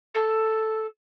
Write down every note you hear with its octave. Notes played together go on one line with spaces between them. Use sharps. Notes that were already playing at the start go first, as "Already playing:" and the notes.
A4